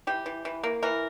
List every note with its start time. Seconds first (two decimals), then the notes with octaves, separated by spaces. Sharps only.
0.07 E3 G4
0.26 E3
0.45 E3
0.63 A#3
0.83 E3 A#4